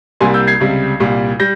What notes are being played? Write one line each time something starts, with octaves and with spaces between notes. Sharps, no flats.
C2 C3 G3 A#3 G#5 C6
E6 G6
G#6 C7
C#2 C3 G3
C2 A#2 G3
G3 G6 A#6